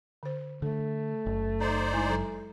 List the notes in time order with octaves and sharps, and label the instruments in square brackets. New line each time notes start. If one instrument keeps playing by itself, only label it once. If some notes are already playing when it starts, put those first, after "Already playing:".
[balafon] D3 C5
[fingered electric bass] D3 [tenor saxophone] A3 [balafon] A4
[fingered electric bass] F#1
[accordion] D#4 C5 D5 [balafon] A#5
[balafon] G#3 E4 G#5
F#3 A4 A#5